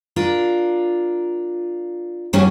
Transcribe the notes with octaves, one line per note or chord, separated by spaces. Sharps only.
D4 F4 A#4
G2 F#3 C#4 E4 G4